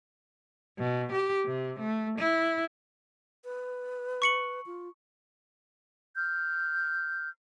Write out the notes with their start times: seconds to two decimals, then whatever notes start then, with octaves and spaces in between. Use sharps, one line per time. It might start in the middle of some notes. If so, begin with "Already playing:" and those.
0.79 B2
1.12 G4
1.46 C3
1.80 A3
2.19 E4
3.45 B4
4.22 C#6 C#7 F#7
4.66 F4
6.16 F6 G6